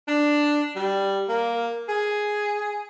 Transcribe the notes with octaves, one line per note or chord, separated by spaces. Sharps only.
D4
G3
A#3
G#4